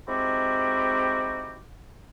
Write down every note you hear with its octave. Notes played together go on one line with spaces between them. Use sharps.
G#3 C4 D#4 E4 F#4 G4